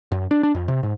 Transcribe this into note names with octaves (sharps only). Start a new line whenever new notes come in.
F#2
D4
D4
F2
C3
G#2